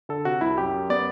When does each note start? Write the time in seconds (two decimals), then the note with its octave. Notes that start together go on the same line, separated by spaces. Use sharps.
0.09 D3 A4
0.25 C3 F#4
0.41 C2 E4
0.58 F#2 G4
0.74 F#2
0.90 B3 D5